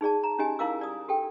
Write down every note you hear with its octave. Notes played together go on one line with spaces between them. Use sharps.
D#4 G#4 D5 A5
A#5
C#4 D#4 G4 D#5 G#5
D#4 E4 A#4 F5 D6 E6
D5 D#6
G4 A4 G5